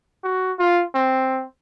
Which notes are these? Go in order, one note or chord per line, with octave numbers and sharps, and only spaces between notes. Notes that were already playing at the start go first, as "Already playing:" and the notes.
F#4
F4
C4